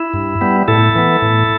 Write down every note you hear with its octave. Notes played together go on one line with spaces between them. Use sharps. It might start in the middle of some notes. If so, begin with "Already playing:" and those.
Already playing: E4
G2
G3 B3
A2 E4 A4
E3 B3
A2